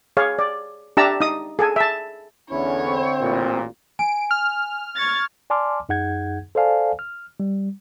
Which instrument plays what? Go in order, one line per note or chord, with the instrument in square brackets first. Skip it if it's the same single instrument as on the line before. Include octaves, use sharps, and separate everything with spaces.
[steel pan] G#4 C#5 F5
D5
D4 G4 E5 A5 A#5 E6
D#4 D#6
G#4 A4 G#5
E5 A5
[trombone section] E2 C#4 [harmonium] D3 E4 [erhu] C#5
[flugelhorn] C4
[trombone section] A1 A#2
[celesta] G#5 [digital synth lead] D7
[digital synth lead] F6
[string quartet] C#6 G#6 A6
[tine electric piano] D5 G#5 A5 C6 D6 F6
F#2 D#4 G#4 F#5 G6 G#6
A4 C5 D5 F5 G#5 A5
F6
G3